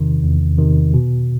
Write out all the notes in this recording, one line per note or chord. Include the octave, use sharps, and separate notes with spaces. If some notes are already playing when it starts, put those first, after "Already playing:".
Already playing: E2 C3 D#3
E2
C3 D#3
B2